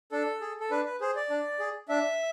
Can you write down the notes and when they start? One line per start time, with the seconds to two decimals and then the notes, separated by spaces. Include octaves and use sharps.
0.12 D4 A4
0.41 G#4
0.60 A4
0.71 D4 B4
0.86 B4
1.01 G#4 C5
1.16 D5
1.30 D4
1.59 G#4
1.89 D4 E5